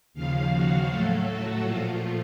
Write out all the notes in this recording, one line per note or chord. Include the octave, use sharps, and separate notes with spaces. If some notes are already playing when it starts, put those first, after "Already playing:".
D#2 C#3 F3 F5
F#4
A2 F#3 A3 A4
F#4
A#2 F3 A3 F4